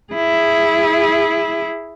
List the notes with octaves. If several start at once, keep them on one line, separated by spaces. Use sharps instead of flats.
E4 G#4